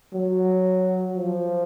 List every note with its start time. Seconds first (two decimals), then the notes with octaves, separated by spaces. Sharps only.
0.13 F#3
1.16 F3